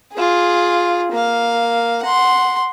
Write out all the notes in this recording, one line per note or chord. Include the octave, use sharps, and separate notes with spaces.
F4 G#4
A#3 F5
F#5 C6